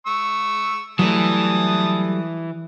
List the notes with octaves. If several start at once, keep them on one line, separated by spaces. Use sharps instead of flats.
C#6 E6
E3 F#3 G3 A3 A5 D#6